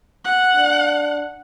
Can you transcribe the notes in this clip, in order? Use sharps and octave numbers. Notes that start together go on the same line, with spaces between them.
F#5
D4